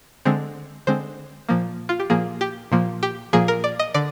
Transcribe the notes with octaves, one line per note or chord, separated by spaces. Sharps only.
D3 G#3 C4
D3 G#3 C4 C5
A#2 F3 A#3
F4
G4
A#2 F3 A#3 G#4
G4
A#2 F3 A#3
G4
A#2 F3 A#3 G#4
A#4
D5
D#5
D3 D5